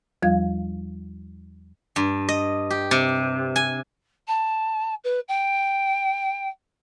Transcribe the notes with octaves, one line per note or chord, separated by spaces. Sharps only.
E2 F3 G3 F4 F5 G#6
G2
D#5
G4
C3
G#5
A5
B4
G5